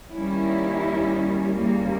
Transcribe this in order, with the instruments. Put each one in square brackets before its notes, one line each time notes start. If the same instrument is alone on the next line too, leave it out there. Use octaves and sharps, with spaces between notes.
[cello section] D#2 D#3 G3 C#4 E4
D#2 C#3 G3 A#3